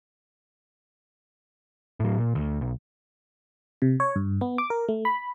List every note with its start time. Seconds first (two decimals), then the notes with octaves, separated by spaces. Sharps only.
2.00 A2 F#3
2.18 A#2
2.35 D2
2.61 B1
3.82 C3
4.00 C#5
4.16 G2
4.41 B3
4.58 D6
4.70 A#4
4.88 A3
5.05 B5